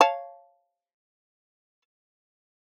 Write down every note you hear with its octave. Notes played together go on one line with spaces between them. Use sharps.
C#5 F5 A5